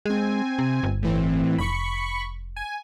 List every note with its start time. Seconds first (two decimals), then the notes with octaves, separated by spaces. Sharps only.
0.06 G#3 C4 G#5
0.59 C3
0.83 G1
1.02 A2 E3 C4
1.58 F1 B5 C#6
2.56 G#5